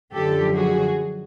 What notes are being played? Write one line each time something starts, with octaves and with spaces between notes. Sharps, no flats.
F#2 D3 F3 G4 A4
F#4 G#4